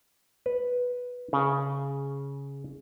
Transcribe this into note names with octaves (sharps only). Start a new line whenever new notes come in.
B4
C#3